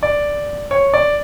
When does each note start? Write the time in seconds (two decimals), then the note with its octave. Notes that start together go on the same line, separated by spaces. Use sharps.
0.03 D5
0.71 C#5
0.94 D5